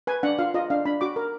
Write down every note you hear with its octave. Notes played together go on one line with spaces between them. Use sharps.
B4 G#5
D4 F#5
F4 F5
F4 D#5
D4 F5
D4 B5
F#4 D6
A#4